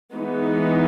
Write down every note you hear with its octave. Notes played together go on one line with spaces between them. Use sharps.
E3 G#3 B3 D#4